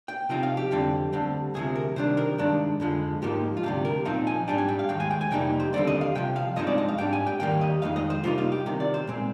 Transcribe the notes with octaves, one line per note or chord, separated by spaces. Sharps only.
G5
C3 F3 C4 D#4 G5
F5
G4
F2 D3 G3 C4
D2 D3 G3 C4
D2 C3 F3 G#4
A#4
C3 D#3 G3 D4 C5
A#4
G2 D#3 G#3 D4
F2 D3 F3 G#3
G#2 F3 A#3 D#4 G4
F4
D2 C3 G3 G4
A#4
A#2 F3 C4 D#4 F5
G#5
G#2 G3 D4 G5
G#5
G5
F5
D#2 D#3 G#3 G5
G#5
G5
G#5
F2 C3 G3 A#3 D#4 G5
C5
D#2 D3 G3 C4 D5
D#5
F5
C2 C3 F3 G5
F5
G2 F3 G#3 C4 D#4 D#5
D5
D#5
F5
G#2 G3 D4 G5
G#5
G5
D#2 D#3 G3 A#3 G5
D#5
F2 D#3 G#3 D#4 F5
D#5
C5
C3 G3 A#3 D#4 F4
F4
G4
C2 C3 D#3
D5
C5
A#2 G#3 C4